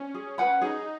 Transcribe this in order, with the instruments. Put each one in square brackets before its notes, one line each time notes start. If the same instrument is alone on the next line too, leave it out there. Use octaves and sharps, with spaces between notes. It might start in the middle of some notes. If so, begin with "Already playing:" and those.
Already playing: [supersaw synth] C#4
[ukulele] G#4
B4 F#5 B5
[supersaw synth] D#4 [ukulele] G#4